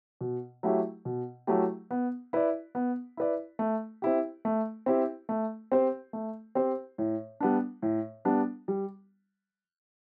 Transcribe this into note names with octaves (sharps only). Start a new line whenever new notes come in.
B2
F#3 A3 E4 G4
B2
F#3 A3 E4 G4
B3
E4 B4 D5
B3
E4 B4 D5
A3
C4 E4 G4
A3
C4 E4 G4
A3
C4 G4 C5
A3
C4 G4 C5
A2
G3 B3 D4
A2
G3 B3 D4
G3